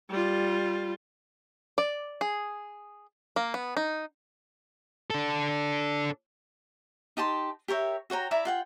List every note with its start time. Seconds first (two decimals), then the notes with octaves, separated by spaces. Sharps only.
0.10 G3 F4
1.78 D5
2.21 G#4
3.36 A#3
3.54 B3
3.77 D#4
5.10 D4 A4
7.17 D#4 G4 A5 C6
7.68 G4 A#4 C#5 E5
8.10 F#4 C#5 G5 A#5
8.31 E4 D5 E5 A#5
8.45 F4 F#5 G5